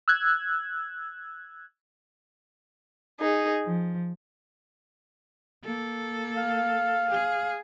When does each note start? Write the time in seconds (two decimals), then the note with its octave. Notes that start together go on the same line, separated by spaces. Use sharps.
0.08 E6 F#6 G#6
3.20 D#4 G#4
3.67 F3
5.64 A#3 A4
6.37 F5
7.10 G#4